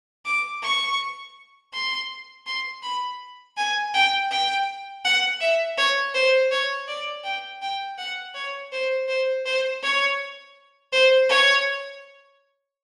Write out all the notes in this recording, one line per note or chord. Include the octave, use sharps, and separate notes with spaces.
D6
C#6
C6
C6
B5
G#5
G5
G5
F#5
E5
C#5
C5
C#5
D5
G5
G5
F#5
C#5
C5
C5
C5
C#5
C5
C#5